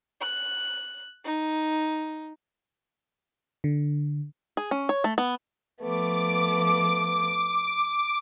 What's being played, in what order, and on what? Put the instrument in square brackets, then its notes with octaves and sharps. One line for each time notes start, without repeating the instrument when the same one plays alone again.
[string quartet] F#6
D#4
[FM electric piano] D3
[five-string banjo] G#4
C#4
C#5
A3
B3
[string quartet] F3 A3 B3 [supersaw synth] D6